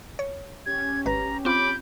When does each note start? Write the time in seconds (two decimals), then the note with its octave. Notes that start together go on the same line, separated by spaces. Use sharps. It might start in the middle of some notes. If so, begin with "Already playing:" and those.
0.19 C#5
0.66 C#4 G4 G#6
1.06 G#1 B4 A#5
1.45 C4 F4 B5 D6 G6